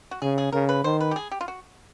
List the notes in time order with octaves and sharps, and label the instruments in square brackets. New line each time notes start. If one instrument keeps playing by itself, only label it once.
[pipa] F#4
[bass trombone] C#3 [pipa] G#4
[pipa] G#4
[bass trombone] C#3 [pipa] A#4
[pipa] B4
[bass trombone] D#3 [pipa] C5
[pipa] B4
G4
G#4
G4
F4
F#4